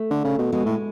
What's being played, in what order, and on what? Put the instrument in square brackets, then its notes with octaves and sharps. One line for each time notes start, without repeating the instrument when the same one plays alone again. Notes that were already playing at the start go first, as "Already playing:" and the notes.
Already playing: [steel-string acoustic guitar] A3
[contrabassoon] D3
C#3
B2
[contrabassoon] B2 [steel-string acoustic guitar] G#3
[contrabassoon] A2